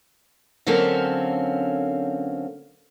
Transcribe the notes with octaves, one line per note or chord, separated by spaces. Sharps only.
D3 F#3 A#3 C4 C#4 A4